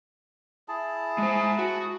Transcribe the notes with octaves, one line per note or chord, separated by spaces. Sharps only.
E4 G#4 A5
G#3 C5
F#4